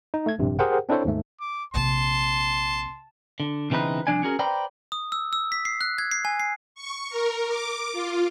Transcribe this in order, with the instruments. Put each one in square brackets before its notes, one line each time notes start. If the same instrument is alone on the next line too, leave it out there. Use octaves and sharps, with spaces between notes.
[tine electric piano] D#4
A3 G#6
A#1 G2 C3
G4 G#4 A#4 C5 F#5 G5
C4 D4 E4 A4 C5 C#5
D#2 G#2 A3
[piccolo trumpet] D6
[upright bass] A#1 C3 [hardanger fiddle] A5 [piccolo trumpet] C6
[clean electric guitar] D3
B1 C#3 E3 C4 D#4 B4
C2 C#3 F3 D4 D5 G#5
C#4 F#4 G#4 A#4
B4 C5 D5 G5 A#5 B5
[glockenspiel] D#6
E6
E6
B6
C7
F#6
G#6
C7
G#5
C7
[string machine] C#6
A#4
D6
F4